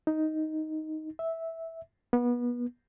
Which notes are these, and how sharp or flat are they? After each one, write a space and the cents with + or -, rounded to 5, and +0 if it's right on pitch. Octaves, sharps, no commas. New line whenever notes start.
D#4 +5
E5 -10
B3 -25